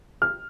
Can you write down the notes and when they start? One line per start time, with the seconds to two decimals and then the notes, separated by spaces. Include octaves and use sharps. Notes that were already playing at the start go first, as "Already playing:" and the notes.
0.22 F6